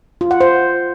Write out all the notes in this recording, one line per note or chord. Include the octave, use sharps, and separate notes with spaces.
F4
F#5
C5